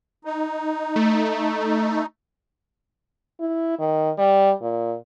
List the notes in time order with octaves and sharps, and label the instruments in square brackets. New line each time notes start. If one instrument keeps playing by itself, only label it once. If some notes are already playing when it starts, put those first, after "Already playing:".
[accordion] D#4
[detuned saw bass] A3
[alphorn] E4
D#3
G3
A#2